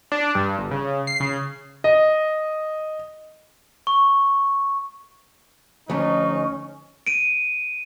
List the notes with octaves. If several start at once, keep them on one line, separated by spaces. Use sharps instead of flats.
D4
G2
G1
C#3
C7
C#3
D#5
C#6
D2 F3 A3 C#4 D#4
D7 D#7